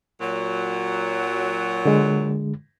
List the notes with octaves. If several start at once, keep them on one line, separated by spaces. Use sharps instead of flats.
A#2 F#3
D3 G#3